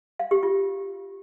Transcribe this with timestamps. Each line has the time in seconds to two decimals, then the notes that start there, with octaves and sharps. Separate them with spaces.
0.19 F5
0.31 G4
0.43 F4